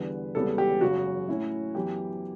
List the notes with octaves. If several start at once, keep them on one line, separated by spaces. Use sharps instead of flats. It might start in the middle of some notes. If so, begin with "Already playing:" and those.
Already playing: E2 D3 G3 B3 B4
E1 E2 C#3 G3 B3 A4
G4
F#1 F#2 C#3 F#3 F#4
A2 F#3 C#4 E4
F#2 E3 B3 E4 G4